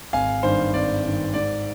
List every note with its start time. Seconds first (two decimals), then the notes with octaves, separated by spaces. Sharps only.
0.13 G#1 F5 G#5
0.43 G2 D#3 C5
0.74 G#1 D5
1.04 G2 D#3
1.34 G#2 D5